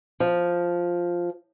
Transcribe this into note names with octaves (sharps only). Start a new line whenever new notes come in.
F3